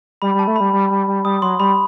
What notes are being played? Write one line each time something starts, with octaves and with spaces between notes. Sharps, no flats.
G3 B5
G3
A5
A3
G3 B5
G3
G3
G3
G3 D#6
F#3 C6
G3 B5